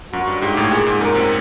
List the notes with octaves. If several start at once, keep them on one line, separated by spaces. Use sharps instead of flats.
F#2 F#4
G2
G#2 G4
A2
A#2 G#4
G#2
F#2 A#4
C3